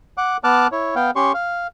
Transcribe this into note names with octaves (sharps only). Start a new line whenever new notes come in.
F#5 D6
B3 A5 D6 F6 F#6
E4 C#5
B3 F5 G5
C#4 G4 C6 C#6
F5